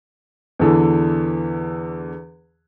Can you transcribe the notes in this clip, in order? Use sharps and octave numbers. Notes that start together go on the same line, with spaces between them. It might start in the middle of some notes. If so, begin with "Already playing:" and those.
E2 D3 E3